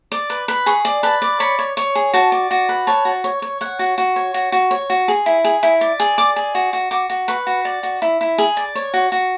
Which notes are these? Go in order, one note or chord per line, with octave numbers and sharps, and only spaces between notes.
D5
B4
B4
G#4 C#6
D5
B4 A5
D5
C#5 B5
C#5
C#5
G#4
F#4 A5
D5
F#4
B4
C#5 A5
F#4
C#5
C#5
C#5 F#5
F#4
F#4
C#5
F#4
F#4
C#5
F#4
G#4
E4
G#4
E4
D5
G#4
D5 D6
G#4
F#4
F#4
F#4 D6
F#4
B4 C#6
F#4
D5
F#4
E4
E4
G#4
D5
C#5
F#4
F#4